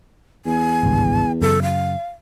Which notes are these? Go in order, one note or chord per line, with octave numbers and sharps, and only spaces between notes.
E2 G#5
G#1 C#2 G2
F#2 C#3 A4
F5